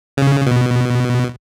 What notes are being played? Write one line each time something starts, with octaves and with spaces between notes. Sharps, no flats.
C#3
B2